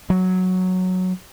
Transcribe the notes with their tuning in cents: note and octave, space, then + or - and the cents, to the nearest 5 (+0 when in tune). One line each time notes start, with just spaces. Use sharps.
F#3 -5